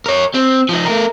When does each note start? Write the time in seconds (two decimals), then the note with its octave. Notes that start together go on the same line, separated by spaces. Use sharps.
0.06 A#4 C#5
0.34 C4
0.69 F3 D#4
0.86 A3 A#4